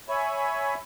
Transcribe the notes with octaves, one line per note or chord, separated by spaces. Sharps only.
C#5 E5 G#5 B5